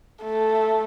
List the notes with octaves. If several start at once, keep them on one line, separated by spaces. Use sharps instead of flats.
A3